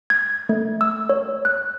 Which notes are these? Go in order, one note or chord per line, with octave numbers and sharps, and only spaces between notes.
G#6
A3
E6
C#5
F#6